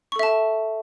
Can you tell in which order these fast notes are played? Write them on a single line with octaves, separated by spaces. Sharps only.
C#6 A4 E5 A5